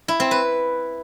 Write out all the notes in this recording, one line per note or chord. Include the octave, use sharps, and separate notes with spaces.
E4
C4
B4